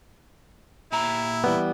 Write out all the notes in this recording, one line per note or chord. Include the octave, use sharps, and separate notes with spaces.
A#2 E4 G4 A#5
E3 G3 B3